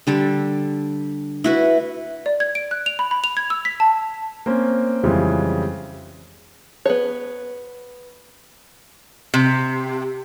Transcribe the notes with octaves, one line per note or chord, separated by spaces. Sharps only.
D3 G3 A4
E4 F#4 B4
D5
G#6
D7
F#6
F7
B5
B5
F7
G#6
E6
B6
A5
A#3 C4 C#4
F2 C#3 E3 G3 G#3
B3 G#4 C#5
C3